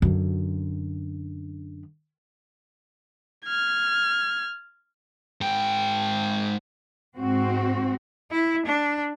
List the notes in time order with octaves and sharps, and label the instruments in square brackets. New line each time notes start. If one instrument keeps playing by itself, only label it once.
[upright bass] F#2 D3
[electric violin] F6 G#6
[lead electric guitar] G#2 G5
[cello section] G#2 C4 F#4
[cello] E4
D4